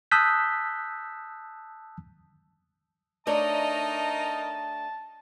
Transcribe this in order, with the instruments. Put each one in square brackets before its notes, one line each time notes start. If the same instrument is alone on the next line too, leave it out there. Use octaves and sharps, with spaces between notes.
[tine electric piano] A5 D#6 E6 F#6 G6 B6
[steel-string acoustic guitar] A3 D4 C#5 [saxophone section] D#4 A#4 D#5 [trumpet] A5